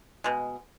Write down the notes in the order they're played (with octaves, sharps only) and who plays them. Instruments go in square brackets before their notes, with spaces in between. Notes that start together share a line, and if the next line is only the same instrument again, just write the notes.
[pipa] B2 G#3